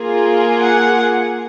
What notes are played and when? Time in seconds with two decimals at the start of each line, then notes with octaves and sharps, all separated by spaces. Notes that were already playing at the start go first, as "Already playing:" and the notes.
Already playing: A#3 F4 G#4
0.61 F#5